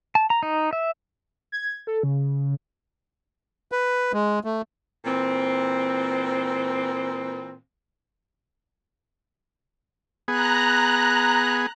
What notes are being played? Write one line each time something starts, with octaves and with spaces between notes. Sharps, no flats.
A5
A#5
D#4
E5
G#6
A4
C#3
B4
G#3
A3
A#2 E3 C4
B3 G#4 A#5 F#6